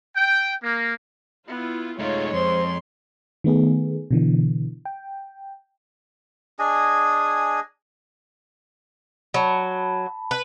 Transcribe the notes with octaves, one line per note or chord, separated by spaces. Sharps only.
G5
A#3
B3 E4 F4
G#3 A3 D#4 F4 C#5
F2 C5 C6
D#3 A3 B3 G#4
B2 D3 E3
G5
D4 G#4 D#5 G#5
F#3 A5 B5
B4